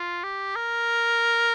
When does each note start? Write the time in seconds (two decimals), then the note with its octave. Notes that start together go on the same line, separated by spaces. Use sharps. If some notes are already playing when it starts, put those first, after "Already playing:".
Already playing: F4
0.24 G4
0.55 A#4